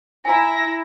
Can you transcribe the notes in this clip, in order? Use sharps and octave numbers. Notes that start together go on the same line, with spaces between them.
E4 G#5 A#5 A#6